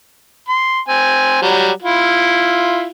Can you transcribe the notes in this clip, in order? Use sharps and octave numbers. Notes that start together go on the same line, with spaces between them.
C6
C4 G#5
F#3 G3
E4 F4